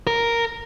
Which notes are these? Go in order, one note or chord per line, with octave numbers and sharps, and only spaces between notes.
A#4